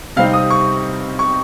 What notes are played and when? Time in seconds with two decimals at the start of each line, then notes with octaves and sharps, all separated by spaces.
0.16 C3 G3 C4 D#4 F5
0.33 D#6
0.50 C#6
1.19 C#6